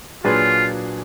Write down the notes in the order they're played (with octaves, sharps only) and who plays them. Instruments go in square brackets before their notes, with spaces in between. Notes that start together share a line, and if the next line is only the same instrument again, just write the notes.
[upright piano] A#2 F#3 D4 G#4 B4 [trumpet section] F4